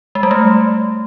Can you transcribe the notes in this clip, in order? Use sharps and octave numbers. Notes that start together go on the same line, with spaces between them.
G#3
G3
A3